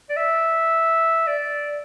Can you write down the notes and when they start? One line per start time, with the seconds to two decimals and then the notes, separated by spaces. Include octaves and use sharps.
0.10 D5
0.16 E5
1.27 D5